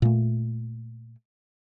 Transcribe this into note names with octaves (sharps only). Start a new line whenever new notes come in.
A#2 A3